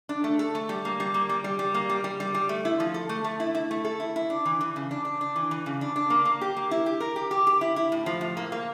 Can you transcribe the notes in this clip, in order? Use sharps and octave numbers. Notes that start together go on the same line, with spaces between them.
D4
A3
A4
A3
G3
A#3
G3
A#3
G3
G3
G3
A#3
G3
G3
G3
G3
A3
E4
F3
A4
A3
A3
E4
E4
A3
A4
E4
E4
D4
E3
E3
C#3
D4
D4
D4
E3
E3
C#3
D4
D4
A#3
A#3
G4
A#3
E4
G4
A#4
G4
G4
G4
E4
E4
A2
F3
A2
A#3
A#3